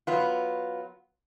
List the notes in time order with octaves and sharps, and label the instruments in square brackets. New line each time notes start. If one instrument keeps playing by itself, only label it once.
[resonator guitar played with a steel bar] F#3 B3 F4